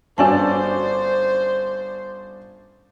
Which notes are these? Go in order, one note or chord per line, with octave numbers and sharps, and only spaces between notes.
G1 C#4 F#4 C5 D5 G#5 A5